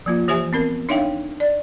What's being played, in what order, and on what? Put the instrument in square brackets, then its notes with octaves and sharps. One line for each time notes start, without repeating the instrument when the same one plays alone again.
[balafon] F3 A#3 F4
E3 G4 C5 E5 G#5
B3 C4 A#4
D4 D#4 C#5 E5 F5 G5
D5